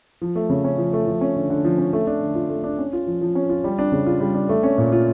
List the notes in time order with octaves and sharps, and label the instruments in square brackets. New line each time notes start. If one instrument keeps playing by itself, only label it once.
[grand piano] F3
A3
C#3
C#4
F3
A3
F3
C#4
D3
D3
F3
C#4
A3
D4
D3
F4
A3
D4
C#4
F4
F3
F3
C#4
F4
G3
D4
C#3
F4
G3
D4
A3
C#4
A#2
F4